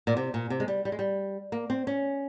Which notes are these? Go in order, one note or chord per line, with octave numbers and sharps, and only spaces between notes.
A#2
C3
A#2
C3
G#3
G3
G3
G#3
G3
A#3
C4
C#4